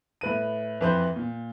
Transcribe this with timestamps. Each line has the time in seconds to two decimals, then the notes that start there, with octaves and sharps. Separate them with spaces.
0.21 A2 B4 D#7
0.81 F2 E3 B4 C5 G6
1.16 A#2